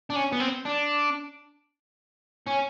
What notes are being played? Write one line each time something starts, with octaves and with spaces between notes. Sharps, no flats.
D4
C#4
B3
C4
D4
C#4